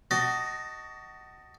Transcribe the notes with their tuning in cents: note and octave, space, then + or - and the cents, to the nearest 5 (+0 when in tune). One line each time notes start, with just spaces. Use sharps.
F#4 +30 D#5 +0 A5 +20